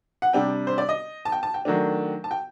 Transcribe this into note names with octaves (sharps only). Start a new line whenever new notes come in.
F#5
C3 G3 D4 G5
C5
D5
D#5
A5
G5
A5
G5
D#3 F#3 A3 D4
A5
G5